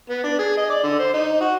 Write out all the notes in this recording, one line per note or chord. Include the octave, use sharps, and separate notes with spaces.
B3
D4
G#4
D#5
D5
D3
C5
D#4
F#4